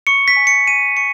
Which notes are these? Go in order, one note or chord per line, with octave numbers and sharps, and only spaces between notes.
C#6 C#7
B6
G#5
C#7
G#5 D#7
C#6 C#7